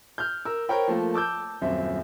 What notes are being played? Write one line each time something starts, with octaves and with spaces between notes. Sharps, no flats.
F6 G6
A#4 E6
A#4 C5 C#5 G5 B5
F3 A3 A#3
A5 D6 E6 G6
D#1 F#2 C4 E5